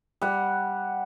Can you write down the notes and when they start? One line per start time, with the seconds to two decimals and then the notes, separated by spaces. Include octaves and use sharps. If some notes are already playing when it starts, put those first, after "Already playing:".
0.22 G3 F#5